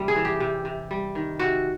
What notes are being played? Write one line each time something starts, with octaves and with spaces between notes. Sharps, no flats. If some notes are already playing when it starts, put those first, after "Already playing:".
Already playing: C3 G3
G#4
E3
G4
C3
C3
G3
D#3
C3 F#4